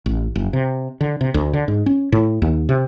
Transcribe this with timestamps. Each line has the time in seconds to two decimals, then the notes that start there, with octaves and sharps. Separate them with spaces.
0.06 A1
0.36 F#1
0.53 C3
1.01 D3
1.21 C3
1.34 D2
1.53 D3
1.68 G#2
1.86 C#4
2.12 A2
2.42 D#2
2.69 C3